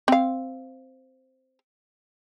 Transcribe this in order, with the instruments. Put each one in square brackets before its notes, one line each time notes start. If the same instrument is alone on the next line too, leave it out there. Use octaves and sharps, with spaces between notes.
[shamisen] C4 F5